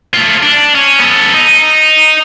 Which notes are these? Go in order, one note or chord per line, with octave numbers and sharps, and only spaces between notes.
A3 F4
D4
C#4
B3 A4
D#4